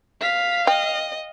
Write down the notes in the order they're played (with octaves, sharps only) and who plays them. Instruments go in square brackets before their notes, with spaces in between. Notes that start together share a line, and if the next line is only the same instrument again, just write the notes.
[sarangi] F5 [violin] B6
[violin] D#5 [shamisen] G5